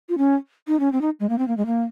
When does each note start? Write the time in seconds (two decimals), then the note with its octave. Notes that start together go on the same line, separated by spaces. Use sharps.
0.09 F4
0.18 C#4
0.67 D#4
0.80 C#4
0.92 C4
1.01 D#4
1.20 G#3
1.29 A#3
1.38 C4
1.48 A#3
1.57 G#3
1.66 A#3